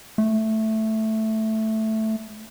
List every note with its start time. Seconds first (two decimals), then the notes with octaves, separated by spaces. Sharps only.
0.18 A3